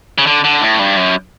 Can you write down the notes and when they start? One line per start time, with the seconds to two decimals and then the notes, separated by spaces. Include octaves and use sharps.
0.18 C#3
0.27 D3
0.44 D3
0.61 A2
0.79 G2
0.97 F#2